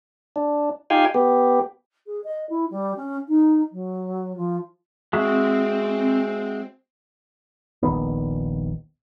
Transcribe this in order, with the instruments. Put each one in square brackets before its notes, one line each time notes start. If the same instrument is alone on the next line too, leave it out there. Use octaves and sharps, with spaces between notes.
[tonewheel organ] D4
D#4 F4 G4 F5 G5 G#5
B3 G4
[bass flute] G#4
D#5
E4
G3
C#4
D#4
F#3
F3
[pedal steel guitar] G#3 F#4 E5 [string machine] C4
[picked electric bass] D#1 A#1 D#3 B3